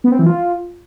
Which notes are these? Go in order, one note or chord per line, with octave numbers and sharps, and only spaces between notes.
B3
C4
E3
F4